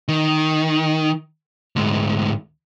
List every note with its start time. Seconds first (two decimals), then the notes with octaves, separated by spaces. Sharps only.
0.08 D#3
1.76 D2 G#2